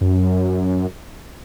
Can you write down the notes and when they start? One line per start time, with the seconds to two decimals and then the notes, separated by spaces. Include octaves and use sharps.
0.01 F#2